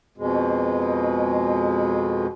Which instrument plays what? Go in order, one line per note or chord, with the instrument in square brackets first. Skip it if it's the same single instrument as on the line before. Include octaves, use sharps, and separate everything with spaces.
[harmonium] F2 B2 G#3